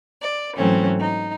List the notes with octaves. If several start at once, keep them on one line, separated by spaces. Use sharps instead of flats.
D5
G#2 E3 F#3 A3 C4 C#4
D#4